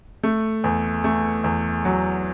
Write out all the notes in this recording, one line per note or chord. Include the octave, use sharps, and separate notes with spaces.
A3
E2
A3
E2
F#3